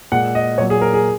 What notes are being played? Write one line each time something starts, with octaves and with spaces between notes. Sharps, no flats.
A#2 G#3 F#5
D#5
A#2 F#3 C#5
G#4
A#4
G#4